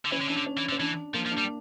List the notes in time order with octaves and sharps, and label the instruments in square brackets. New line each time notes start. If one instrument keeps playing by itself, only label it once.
[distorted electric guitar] D3
[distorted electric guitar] E3 [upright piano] C#4
[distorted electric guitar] D3
[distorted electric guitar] E3 [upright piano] D4
[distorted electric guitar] D3
[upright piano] C#4
[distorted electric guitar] E3
D3
[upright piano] C#4
[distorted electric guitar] E3 [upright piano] D4
[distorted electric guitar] F3 [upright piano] A#3
[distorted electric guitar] F3
[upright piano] D4
[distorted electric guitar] G3